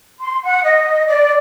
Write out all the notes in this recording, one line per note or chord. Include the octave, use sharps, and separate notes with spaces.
C6
F#5
D#5
D5